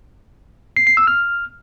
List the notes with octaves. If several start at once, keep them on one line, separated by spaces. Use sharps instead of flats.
C7
C7
E6
F6